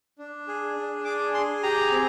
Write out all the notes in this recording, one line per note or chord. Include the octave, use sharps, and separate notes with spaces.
D4
G#4
D4
G#4 D6
G#4 C6
G4 A#5
C4